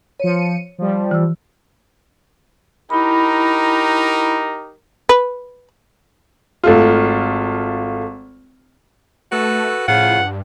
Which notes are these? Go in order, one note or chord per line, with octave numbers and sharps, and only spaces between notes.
F3 C#5 C#7 D#7
F3 G3
E3 E6
D#4 E4 G4 A#4 B5
B4
G#1 A3 F4
A3 F#4 A4 B4
A2 C#3 F3 F4 F#5
G2